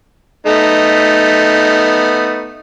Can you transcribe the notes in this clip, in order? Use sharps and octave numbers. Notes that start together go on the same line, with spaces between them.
A3 B3 D#4